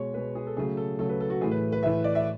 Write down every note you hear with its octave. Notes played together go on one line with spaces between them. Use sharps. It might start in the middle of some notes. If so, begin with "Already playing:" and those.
Already playing: B2 G#3 C#5
B2 G#3 B4
G#4
A4
C#3 F#3 A3 G#4
A4
C#3 F#3 A3 A4
B4
A4
F#4
A2 E3 A3 G#4
B4
B4
A2 E3 A3 E5
D5
E5